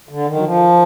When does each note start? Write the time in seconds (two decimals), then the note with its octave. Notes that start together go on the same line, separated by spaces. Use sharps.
0.09 D3
0.27 D#3
0.36 F#3
0.43 F3